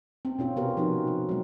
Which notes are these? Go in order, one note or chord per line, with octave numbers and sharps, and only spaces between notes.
C4
B2 C#4 F4
C3 B3 C4 G4 A#4
F3 D#4 F#4
F3
F#3 G#3